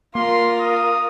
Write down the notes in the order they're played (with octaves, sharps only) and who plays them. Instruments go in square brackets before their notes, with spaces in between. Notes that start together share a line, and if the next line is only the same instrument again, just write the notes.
[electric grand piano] A#3 [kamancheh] F4 A#4 [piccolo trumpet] C6
[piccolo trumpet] D#6